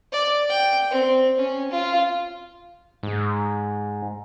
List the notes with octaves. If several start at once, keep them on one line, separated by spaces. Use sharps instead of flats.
D5
G5
C4
C#4
F4
G#2